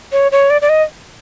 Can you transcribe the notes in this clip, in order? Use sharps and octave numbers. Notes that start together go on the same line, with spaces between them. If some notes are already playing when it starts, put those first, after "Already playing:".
C#5
C#5
D5
D5
D#5